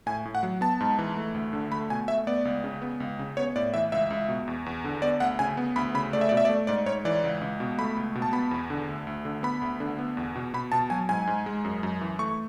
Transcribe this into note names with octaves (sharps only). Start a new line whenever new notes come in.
A2 G#5
A2
F#5
F#3
B3 A5
G#2
E3
A3
D2
D3
A3 B5
B2 G#5
A3 E5
B3 D5
C#2
C#3
B3
C#2
C#3
B3 C#5
A2 D5
E3 E5
C#2 E5
C#2
B2
E2
E2
D3
B3 D5
D2 F#5
C#3 G#5
B3
D2 B5
C#3 B5
A3 D5
E5
B2 D5
E5
D5
A3
G#2 D5
G#2 C#5
E3 D5
C#2
C#2
B2
A3 B5
C#2
B2
A5
B3 B5
E2
D3
D2
D2
D3
B3 B5
D2
D3
B3
E2
B2
B2 B5
B2 A5
F#3 G#5
G#2 G#5
G#2
G#3
F#2
F#2
E3
A3 C#6